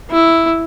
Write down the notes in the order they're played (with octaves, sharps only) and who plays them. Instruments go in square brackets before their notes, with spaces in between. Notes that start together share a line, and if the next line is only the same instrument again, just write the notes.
[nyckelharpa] E4